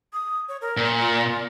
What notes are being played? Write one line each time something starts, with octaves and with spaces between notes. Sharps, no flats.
D#6
C#5
A#4
A#2
F4